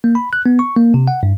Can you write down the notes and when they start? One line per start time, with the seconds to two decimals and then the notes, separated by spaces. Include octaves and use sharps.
0.04 A#3
0.15 B5
0.33 F#6
0.46 B3
0.59 C#6
0.76 A#3
0.94 C3
1.08 F#5
1.23 G2